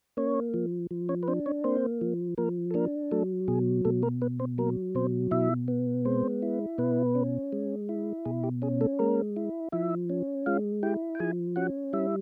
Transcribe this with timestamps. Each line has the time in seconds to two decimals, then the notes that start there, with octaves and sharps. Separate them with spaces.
0.17 A#3 C#4 C#5
0.54 F3
0.91 F3
1.09 C#4 C#5
1.23 B4
1.28 C4 D4 C5
1.46 C#4 C#5
1.64 A#3 C4 C5
2.01 F3
2.38 F3 A#3 A#4
2.71 A4
2.74 A#3 D4 A#4
3.11 F#3 A3 A4
3.48 B2 G#4
3.85 B2 A3 A4
4.03 A#3 A#4
4.22 B3 B4
4.40 C4 C5
4.58 F#3 A#3 A#4
4.95 B2 C4 C5
5.31 B2 E4 E5
5.68 B3
6.05 G#3 C4 C5
6.42 E4
6.78 B2 B3 B4
7.15 C#4
7.53 G#3
7.89 E4
8.25 B2 G#4
8.43 G4
8.62 C#4 G#4
8.81 A3 A4
8.99 G#3 A#3 A#4
9.36 E4
9.72 F3 E4 E5
10.10 C#4
10.46 G#3 F4 F5
10.83 E4 G4 G5
11.15 G5
11.19 F3 G#4 G#5
11.56 C#4 F#4 F#5
11.93 G3 E4 E5